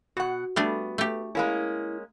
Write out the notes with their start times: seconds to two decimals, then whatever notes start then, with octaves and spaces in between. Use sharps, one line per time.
0.17 B2 F#4 F#5
0.56 G3 A3 B3 D4
0.98 A3 G4
1.35 G#3 A#3 C#4 E4